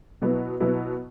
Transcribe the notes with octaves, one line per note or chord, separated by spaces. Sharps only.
B2 F#3 B3 E4
B2 F#3 B3 E4